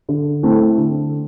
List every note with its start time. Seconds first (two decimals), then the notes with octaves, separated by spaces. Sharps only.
0.09 D3
0.43 A3 C4 E4 A4
0.78 D3